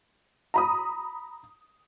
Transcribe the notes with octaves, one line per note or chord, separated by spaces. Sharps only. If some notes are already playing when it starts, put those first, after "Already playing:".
A#5 B5 D#6